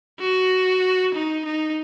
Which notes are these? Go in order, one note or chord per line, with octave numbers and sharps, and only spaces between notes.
F#4
D#4
D#4